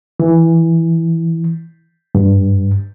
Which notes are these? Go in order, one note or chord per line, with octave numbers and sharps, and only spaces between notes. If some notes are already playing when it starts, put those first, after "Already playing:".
E3
G2